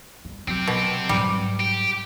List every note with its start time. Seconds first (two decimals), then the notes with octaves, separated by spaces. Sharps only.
0.25 G3
0.48 F#3 C4 G4
0.67 B2
1.09 G#2 F#3 G3
1.60 G4